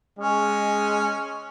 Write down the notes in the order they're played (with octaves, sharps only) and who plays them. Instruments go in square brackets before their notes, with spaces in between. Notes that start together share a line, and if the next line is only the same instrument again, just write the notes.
[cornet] G#3 [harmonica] C#4